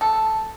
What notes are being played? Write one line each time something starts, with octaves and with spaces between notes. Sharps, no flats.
A4